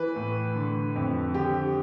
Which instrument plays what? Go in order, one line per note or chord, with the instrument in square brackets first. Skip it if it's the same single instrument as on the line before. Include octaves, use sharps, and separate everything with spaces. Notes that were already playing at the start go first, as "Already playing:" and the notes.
Already playing: [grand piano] E3 B4
A2
D3
F2
D3 G4